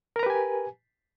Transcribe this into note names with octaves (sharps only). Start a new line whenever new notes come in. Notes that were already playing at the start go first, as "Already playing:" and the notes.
G4 A#4 B4 G#5 A#5